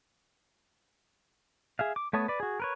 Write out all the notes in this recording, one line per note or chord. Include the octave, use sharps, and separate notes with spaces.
G#4 E5 F5
D6
A3 B3 C#5 A5 D#6
B4 D5
F#4 G#4
A#4 B4 C#5